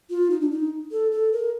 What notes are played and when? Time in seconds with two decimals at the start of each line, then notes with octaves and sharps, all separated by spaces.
0.10 F4
0.30 D#4
0.41 D4
0.51 D#4
0.92 A4
1.12 A4
1.33 A#4